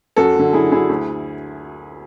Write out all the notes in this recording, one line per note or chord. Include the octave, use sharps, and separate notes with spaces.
F#2 F#4 A4
D3 F#3
F#2 E4 G#4
D3 F#3 E4 G#4
D2